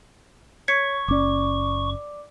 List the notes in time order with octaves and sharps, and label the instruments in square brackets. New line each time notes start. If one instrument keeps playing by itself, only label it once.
[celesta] C#5 [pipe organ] C#6 [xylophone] G#6 B6 C#7
[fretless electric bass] F#1 C#4 [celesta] D5 D6